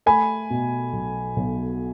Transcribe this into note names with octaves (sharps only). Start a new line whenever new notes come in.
A3 G#5 B5
B2
B1
B1